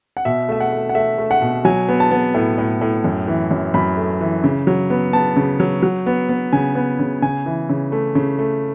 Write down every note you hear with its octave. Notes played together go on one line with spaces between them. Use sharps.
F#5
B2 E5
A3 E5
F#5
A3
F#5
A3 E5
A3
F#5
B2
F#3 G#5
B3
A5
B3
A2
A2
A2
F#2
E3
F#2
F#2 B5
A3
E3
C#3
F#3
B3
B3 A5
C#3
F#3
F#3
B3
B3
C#3 G#5
B3
C#3
C#3 G#5
E3
C#3
A3
C#3
A3